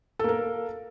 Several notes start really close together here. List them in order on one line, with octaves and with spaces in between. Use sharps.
A4 A#3 A#4